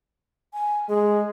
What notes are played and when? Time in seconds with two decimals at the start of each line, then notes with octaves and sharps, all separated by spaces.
0.53 G#5
0.89 G#3 G#4